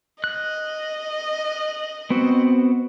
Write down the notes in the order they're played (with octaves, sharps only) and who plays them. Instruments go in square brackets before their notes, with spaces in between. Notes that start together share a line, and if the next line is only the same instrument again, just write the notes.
[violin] D#5 [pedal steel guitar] F#6
[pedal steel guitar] B3 C4 F#4